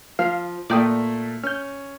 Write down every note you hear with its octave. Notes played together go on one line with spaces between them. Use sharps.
F3 F5
A#2 A3 D5 G5 D#6
C#4 F6 G6